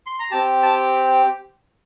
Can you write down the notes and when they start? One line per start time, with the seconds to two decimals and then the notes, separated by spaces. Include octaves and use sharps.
0.06 C6
0.20 A#5
0.31 C4 G4 A5
0.63 A5